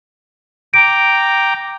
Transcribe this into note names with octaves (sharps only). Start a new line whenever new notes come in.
G5 A#5 D6 D7